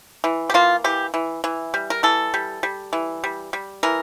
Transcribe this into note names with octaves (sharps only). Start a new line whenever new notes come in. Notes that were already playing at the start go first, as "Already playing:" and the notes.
E3
G4
A#3 F4
E3 G4
E3
E3
G3
A#4
E3 A4
G3
G3
E3
G3
G3
E3 A#4